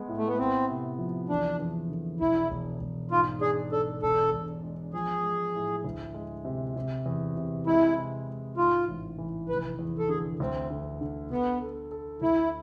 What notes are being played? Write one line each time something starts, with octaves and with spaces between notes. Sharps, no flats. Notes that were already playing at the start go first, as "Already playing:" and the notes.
Already playing: G#3 B3
A2
A3
B3
B3 C4
C3
F3
E2 D4
E2
D3
E1 E4
E1
E1
G#2 F4
D4 G#4
D4 A4
E1 A4
E1
G#3
F3 G#4
G#3
A2
D2
G#3
C3
C3
E2
C3
G#3 E4
C3
G#3
G#2 F4
A1
E3
F1 B4
E2
A4
D3 G#4
D2 C4
D3
D3
D3 B3
A4
A4
D2 E4